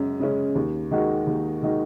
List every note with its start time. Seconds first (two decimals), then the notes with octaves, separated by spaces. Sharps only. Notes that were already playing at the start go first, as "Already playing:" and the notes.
Already playing: F#2 C#3 G#3 C#4
0.20 C#3 G#3 C#4
0.55 D#2
0.91 D#3 G#3 D#4 F#4
1.27 D#2
1.63 D#3 G#3 D#4 F#4